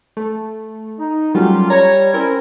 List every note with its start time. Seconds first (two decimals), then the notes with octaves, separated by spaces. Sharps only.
0.17 A3
0.99 D#4
1.35 F#3 G3 A3 A#3 C#4 F4
1.70 G3 C#5 A#5
2.14 C4 C#4 E4 A#4